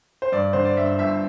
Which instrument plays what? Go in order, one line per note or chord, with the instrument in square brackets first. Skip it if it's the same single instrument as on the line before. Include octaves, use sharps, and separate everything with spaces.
[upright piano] C5
G2 D5
D3 C5
D5
G2 E5
G1 E5